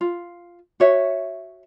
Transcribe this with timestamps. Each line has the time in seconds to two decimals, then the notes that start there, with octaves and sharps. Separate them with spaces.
0.01 F4
0.80 F#4 C#5 E5